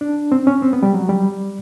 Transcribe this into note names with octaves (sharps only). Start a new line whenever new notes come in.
D4
C4
C#4
C4
B3
G3
F#3
G3